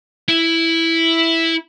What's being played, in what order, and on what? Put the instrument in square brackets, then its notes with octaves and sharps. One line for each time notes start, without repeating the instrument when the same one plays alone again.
[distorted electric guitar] E4